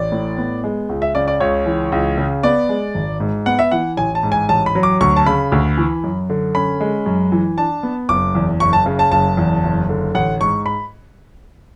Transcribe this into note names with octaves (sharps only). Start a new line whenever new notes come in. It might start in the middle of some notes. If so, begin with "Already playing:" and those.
Already playing: A1 D5
A2
B3
G#3
C#2
E5
C#3 D5
D5
C#2 C#5
E3
C#2
C#3
B3 D5
G#3
G#1
G#2
B3 F#5
E5
E3 F#5
A1 G#5
A5
G#2
G#5
A1 A5
B5
F#3
D6
D2 C#6
A5
C#3 B5
D2
E3
F#2
D3
C#4 B5
G#3
F#2
E3
D4 A5
B3
F#1 D6
E2
F#1 C#6
A5
C#3
A5
F#1 A5
E2
F#1
D3
A1 F#5
G#2 C#6
B5